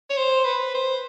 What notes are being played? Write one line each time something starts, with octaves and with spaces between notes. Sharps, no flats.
C#5
C5
B4
C5